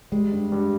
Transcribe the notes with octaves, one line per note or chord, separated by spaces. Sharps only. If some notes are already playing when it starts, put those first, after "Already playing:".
G3 G#3
G2
G2